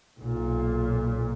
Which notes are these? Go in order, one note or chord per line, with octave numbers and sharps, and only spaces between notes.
B1 A#2